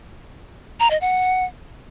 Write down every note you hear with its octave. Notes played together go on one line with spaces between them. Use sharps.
A#5
D#5
F#5